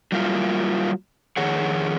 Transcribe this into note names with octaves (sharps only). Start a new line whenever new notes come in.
F#3 G3 A#3 E4 F4
F2 D#3 G#4 C#5 F#5